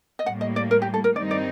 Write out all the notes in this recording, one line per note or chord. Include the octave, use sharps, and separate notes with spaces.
D#5
A2 G3 A#3 F#5
D#5
D5
A#4
G4
A4
A#4
G2 D#3 G3 C4 D#4 D5
D5